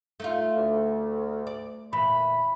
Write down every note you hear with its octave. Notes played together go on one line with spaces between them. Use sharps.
A3 D#4 F4
D2
D5
A#2 E3 B5